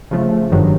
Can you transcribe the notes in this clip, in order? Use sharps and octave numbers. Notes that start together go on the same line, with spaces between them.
C#3 F3 A3
G1 G2 D#3 F#3